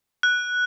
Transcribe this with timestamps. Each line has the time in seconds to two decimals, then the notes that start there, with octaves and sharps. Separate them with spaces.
0.23 F#6